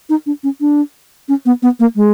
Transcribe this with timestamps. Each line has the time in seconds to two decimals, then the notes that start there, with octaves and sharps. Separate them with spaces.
0.10 D#4
0.26 D4
0.44 C#4
0.61 D4
1.29 C#4
1.46 B3
1.63 B3
1.80 A#3
1.96 G#3